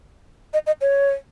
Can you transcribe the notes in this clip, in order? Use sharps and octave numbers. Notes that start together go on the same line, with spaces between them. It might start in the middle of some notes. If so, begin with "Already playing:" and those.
D#5
D#5
C#5